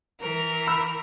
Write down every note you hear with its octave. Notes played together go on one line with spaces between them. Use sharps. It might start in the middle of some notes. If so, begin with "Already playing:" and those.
E3 A#4
B5 E6